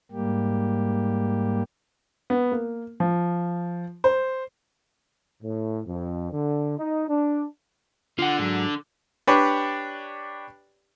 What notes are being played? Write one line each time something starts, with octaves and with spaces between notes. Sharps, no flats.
G#2 G3 A#3 G4
B3
A#3
F3
C5
A2
F2
D3
D#4
D4
D3 F4 F#5
G#2 F#3
D4 G4 B4 C#5 D5